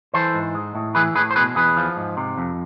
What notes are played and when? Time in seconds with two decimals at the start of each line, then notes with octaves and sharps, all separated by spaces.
0.14 E3 A4 C5
0.34 G#2
0.55 G#3
0.75 A2
0.95 E3 G#4 B4
1.15 A2 G#4 B4
1.31 C5
1.36 B2 G#4 B4
1.56 E2 G#4 B4
1.77 F3
1.97 G#2
2.17 C3
2.38 F2